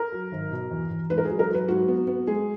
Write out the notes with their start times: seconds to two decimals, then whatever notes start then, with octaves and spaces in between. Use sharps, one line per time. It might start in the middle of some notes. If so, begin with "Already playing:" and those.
Already playing: A#4
0.12 F#3
0.32 G#1
0.51 B2
0.71 E2
0.91 E2
1.10 G#2 B4
1.18 A#4
1.25 F#3 G#4
1.39 A#4
1.49 F#3
1.54 B4
1.68 G#2 F#4
1.88 B3
2.07 B3
2.27 G#3 G#4